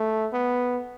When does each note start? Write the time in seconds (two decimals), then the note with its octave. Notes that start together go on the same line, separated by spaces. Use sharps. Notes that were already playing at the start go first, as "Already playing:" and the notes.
Already playing: A3
0.33 B3